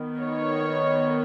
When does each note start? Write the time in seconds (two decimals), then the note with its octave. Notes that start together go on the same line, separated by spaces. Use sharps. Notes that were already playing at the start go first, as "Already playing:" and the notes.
Already playing: D#3 B3
0.19 C#5